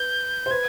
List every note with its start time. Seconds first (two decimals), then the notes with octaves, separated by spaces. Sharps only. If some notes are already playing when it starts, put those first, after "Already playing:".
Already playing: B4 G6
0.46 C5
0.51 B4 G#6